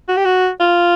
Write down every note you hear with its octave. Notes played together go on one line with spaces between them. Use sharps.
F#4
G4
F#4
F4